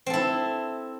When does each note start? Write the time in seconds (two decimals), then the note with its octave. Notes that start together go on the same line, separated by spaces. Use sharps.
0.06 C4
0.10 A4
0.13 E4